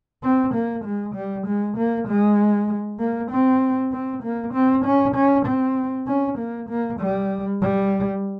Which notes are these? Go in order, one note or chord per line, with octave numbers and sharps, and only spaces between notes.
C4
A#3
G#3
G3
G#3
A#3
G#3
A#3
C4
C4
A#3
C4
C#4
C#4
C4
C#4
A#3
A#3
G3
G3